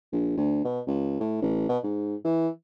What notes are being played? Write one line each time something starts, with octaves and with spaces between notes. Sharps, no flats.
A#1
D2
B2
C#2
A2
A1
B2
G#2
E3